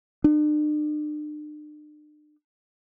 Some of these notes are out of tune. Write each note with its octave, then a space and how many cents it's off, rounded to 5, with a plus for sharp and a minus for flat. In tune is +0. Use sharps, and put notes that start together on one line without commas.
D4 +45